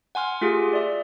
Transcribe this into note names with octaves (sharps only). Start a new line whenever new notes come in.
F#5 G#5 C6 F6
A3 F4 G4 G#4
D5 E5